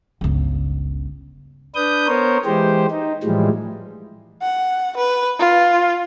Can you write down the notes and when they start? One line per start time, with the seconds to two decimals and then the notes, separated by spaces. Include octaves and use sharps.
0.21 G1 C#2
1.75 D4 B4 D#6 G6
2.07 B3 A#4 C5 C#5
2.45 E3 G#3 G4 C5
2.91 D#4
3.23 A2 E3 F3 G3 G#3
4.42 F#5
4.97 B4
5.39 F4